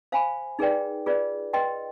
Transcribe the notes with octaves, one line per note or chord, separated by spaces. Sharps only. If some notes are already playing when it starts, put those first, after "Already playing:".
C5 F5 G#5 B5
D#4 G#4 B4 D5 G5
F4 G#4 B4 D5
B4 D#5 G5 C6